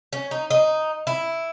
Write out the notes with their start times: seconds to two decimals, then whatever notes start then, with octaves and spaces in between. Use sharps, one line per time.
0.13 C#4
0.31 D#4
0.50 D#4
1.07 E4